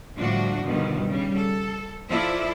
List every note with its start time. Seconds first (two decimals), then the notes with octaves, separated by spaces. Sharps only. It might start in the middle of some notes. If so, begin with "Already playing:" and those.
0.18 A2 D3 F3 G3 D4 F#4
0.64 G2 B2 D3 D#3 F3
1.08 C#3 G3
1.38 A4
2.09 F3 E4 F4 A4 D5 E5